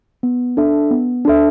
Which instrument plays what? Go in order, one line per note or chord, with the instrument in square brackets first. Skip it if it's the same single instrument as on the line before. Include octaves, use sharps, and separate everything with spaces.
[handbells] B3
D4 A4 E5
B3
D4 A4 E5